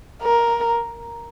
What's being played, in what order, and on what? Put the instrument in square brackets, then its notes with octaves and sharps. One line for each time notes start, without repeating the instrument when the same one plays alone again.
[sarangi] A#4